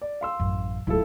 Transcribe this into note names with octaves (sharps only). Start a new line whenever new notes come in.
D5
F5 C6 E6
A1 F#2
D1 G#1 E4 F4 A4